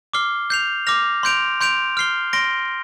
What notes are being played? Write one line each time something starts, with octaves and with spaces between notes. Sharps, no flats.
D6 F6 C7 G7
G6 C7 F7
D6 F6 A#6 F7
C6 G6 D7 F7
C6 G6 D7 F7
F6 C7 G7
C6 A#6 D7 G7